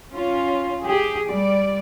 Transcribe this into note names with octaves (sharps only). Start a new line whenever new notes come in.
C#4 F4
G4 G#4
G3 D5